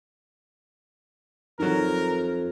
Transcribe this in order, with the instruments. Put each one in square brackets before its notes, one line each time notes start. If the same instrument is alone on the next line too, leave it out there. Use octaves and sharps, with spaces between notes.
[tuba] F2 [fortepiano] D#3 F#3 [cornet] A#4